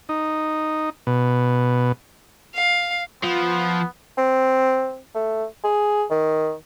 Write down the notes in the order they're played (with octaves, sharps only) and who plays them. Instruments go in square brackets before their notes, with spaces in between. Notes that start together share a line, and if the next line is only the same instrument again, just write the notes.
[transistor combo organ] D#4
B2
[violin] F5
[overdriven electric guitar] F3 [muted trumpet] B3
[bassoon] C4
A3
G#4
D#3